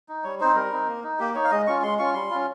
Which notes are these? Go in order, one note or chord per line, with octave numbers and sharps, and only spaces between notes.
D#4
G3 C#5
C4 D#4 C5
G3 A#4
C4 D#4
A#3
D#4
A#3 G4
D#4 C#5
F5
G#3 D#5
C#4 F4 C#6
G#3 C6
C#4 F4 C#6
G3 C6
C#4 F4